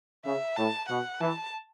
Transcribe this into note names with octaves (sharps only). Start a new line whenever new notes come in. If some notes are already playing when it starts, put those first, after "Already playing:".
C#3 E5
A2 A5
B2 F#5
E3 A5